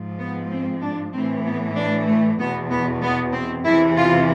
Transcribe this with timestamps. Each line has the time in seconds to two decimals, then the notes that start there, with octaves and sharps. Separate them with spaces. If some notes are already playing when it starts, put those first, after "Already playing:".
Already playing: G#2 F3
0.19 B3
0.51 C4
0.82 D4
1.13 A2 E3 C4
1.45 B3
1.76 D4
2.07 A3
2.39 E2 B2 B3
2.70 B3
3.01 B3
3.33 C4
3.64 E2 C3 E3 E4
3.96 F4